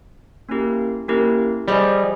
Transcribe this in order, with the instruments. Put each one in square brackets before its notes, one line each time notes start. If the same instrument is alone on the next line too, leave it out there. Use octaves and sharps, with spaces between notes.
[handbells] A#3 C#4 E4 G4 A#4
A#3 C#4 E4 G4 A#4
[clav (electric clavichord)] G3 [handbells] G#4 C5 D#5 G#5